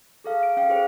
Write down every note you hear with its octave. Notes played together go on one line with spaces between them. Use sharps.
G#4 A4 F5
F5 D7
C#4 F5 G5
G#4 A4 C5